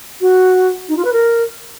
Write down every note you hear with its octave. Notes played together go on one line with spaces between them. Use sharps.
F#4
D#4
F4
B4
A#4